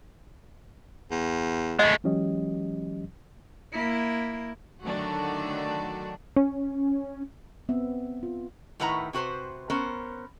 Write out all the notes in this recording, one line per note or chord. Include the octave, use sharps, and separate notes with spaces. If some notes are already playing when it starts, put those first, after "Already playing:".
E2
G#3 A3 D#5
E3 F#3 G#3 C#4 G4 D#5
A#3 E4
D3 D#3 F#3 A3 D4 F#4
C#4
B3 C4 E5
F4
A2 D#3 E4 B4 F#5 A#5
C3 F#4 B4 C5
B3 C#4 A#4 C5